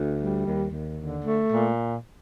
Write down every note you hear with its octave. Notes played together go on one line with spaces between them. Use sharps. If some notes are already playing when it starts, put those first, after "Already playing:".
Already playing: D2
G3
D#2
D#2
D3
A3
A#2